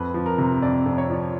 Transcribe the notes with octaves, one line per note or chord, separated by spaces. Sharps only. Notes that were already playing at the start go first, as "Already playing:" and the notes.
Already playing: F2 B4
F3
A#4
C3
F2 D5
F2
C#5
F3